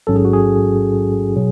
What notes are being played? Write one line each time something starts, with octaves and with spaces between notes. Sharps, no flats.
A1 G#2 F#3 C#4 A4
G#4
F#4
G#4
B2 F#3